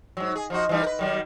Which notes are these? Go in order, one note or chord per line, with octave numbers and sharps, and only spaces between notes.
G#2 F#3
G#4
F3 D#4 F#4
E3 G3 D#4
A#4 B4
D#3 F#3 G3